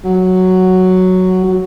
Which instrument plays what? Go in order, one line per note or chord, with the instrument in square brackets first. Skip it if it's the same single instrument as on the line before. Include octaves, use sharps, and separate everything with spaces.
[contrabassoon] F#3
F#3